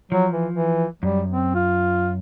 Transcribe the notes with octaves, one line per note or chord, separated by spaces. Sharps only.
F3 F#3
E3
E3
F#2 G3
C4
F4